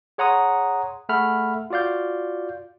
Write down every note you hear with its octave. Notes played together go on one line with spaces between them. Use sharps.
G#4 C#5 F#5 A#5 C6 D#6
A3 G#4 A4 F#5 B5 F6
F4 F#4 D5 F5 G6